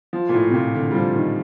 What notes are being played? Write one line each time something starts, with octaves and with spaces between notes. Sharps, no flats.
F3
A#2
A2
C3
A#2
D3
G3
F3
D#3